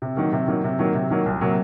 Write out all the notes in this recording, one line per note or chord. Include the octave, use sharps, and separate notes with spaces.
C3
D#3 F#3 A#3
C3
D#3 F#3 A#3
C3
D#3 F#3 A#3
C3
D#3 F#3 A#3
C2
C3 F#3 A#3